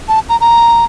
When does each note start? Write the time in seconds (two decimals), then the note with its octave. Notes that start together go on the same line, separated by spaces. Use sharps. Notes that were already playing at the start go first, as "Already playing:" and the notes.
0.08 A5
0.29 A#5
0.41 A#5